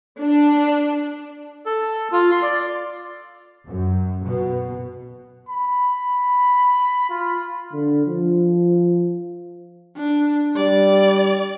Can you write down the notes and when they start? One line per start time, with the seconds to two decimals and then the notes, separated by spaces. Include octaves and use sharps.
0.20 D4
1.66 A4
2.12 F4
2.31 C6
2.42 D5
3.65 F#2
4.24 B2
5.49 B5
7.10 F4
7.73 D3
8.07 F3
9.97 D4
10.57 G3 D5